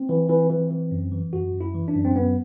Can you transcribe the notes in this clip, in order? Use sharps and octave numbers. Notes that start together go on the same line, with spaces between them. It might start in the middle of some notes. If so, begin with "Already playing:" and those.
Already playing: C4
E3
E3
E3
E3
F#2
E3
F#2 F#4
F#2
E4
E3
D4
F#2
C4
F#2 B3